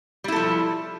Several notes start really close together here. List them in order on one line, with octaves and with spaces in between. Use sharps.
G3 E4 A4 F3